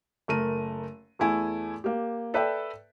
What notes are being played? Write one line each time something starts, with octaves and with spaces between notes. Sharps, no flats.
F#1 A3 A#4 D#7
E2 A3 E4 G#5
A#3 G4
A4 B4 D5 E5 G5